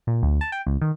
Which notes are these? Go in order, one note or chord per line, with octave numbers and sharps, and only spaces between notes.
A#2
D2
A5
G5
C#2
D#3